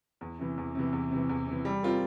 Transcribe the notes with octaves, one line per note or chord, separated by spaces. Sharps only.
E2
C3 E3
E2
C3 E3
E2
C3 E3
E2
C3 E3
G3
C4 F4 A#4